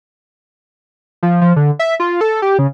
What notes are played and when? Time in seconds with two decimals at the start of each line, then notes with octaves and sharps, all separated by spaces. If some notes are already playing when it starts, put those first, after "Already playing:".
1.23 F3
1.41 F3
1.56 D3
1.79 E5
2.00 F4
2.21 A4
2.42 G4
2.59 C#3